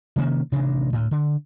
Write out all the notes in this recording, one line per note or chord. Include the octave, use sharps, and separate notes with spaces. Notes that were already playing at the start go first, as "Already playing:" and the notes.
C3 D#3 A#3 C#4
A1 C3 D#3 D4
D2 A2
D3